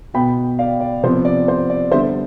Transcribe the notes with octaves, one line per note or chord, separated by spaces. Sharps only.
B2 B3 G5 B5
D5 F5
D5
C3 F3 B3 C5
D5
C5
D5
D3 G3 B3 C5 E5